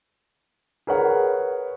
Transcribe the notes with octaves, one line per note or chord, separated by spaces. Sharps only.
G#4 A#4 B4 C#5 F#5